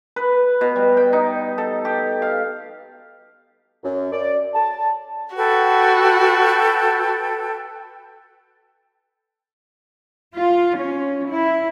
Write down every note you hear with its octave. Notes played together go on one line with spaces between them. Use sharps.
B4
B2
G3
G5
D#4
A4
G4
F5
F#2
D5
A5
F#4 A4 B4 G5
F4
C#4
E4